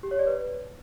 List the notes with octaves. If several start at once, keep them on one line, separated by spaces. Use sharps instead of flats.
G4
C#5
D5
B4